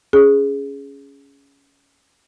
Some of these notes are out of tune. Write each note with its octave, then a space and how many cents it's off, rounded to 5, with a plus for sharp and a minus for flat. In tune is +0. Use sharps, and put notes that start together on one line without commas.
C#4 +15 G#4 +0